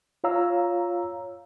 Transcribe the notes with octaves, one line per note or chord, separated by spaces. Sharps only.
F4 C#5 F5 A#5 E6